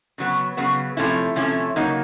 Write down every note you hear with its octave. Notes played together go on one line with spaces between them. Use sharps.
C#3 F#3 B3
C#3 F#3 B3
C3 F3 A3 C#4 E4
C3 F3 A3 C#4 E4
C#3 F#3 A#3 D#4